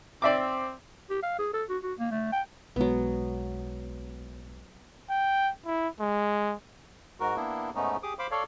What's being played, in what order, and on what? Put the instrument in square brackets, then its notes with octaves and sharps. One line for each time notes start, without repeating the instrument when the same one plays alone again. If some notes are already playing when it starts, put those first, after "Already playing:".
[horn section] C4 [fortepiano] D5 E5 D6
[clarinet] G4
F5
G#4
A4
F#4
F#4
A#3
A3
G5
[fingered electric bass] B1 G#3 [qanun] F#3 B3
[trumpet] G5
E4
G#3
[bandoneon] G#2 F#4 A#4
A#3 B3 D4 E4
G#2 A3 B3 C#4 D#4
G4 G#4 D6 D#6
C5 F5 B5 D6
A4 C#5 D5 F5